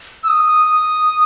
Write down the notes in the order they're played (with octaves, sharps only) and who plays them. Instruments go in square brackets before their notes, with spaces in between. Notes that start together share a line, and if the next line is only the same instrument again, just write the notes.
[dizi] E6
D#6